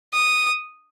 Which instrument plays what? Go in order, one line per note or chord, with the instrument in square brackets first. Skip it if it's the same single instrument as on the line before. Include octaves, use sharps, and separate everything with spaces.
[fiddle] D#6